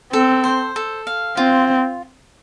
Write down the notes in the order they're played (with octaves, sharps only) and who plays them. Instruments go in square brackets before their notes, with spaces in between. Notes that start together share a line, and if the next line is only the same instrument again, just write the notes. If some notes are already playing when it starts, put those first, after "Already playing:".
[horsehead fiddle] C4 [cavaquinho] A4
[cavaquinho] C5
A4
F5
[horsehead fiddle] C4 [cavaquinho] F4